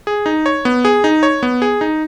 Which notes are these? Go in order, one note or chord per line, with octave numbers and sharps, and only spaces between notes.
G#4
D#4
C#5
B3
G#4
D#4
C#5
B3
G#4
D#4